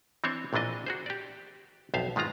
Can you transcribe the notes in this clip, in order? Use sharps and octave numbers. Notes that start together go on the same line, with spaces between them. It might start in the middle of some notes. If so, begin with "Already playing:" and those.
E3 C4 D4 C5 C#5
A#1 A#2 E3 D4 D#5
F#4 G#4 C5
G4 D5
B1 F2 C5 E5 F5
G#2 D#3 G#3 F4 A#5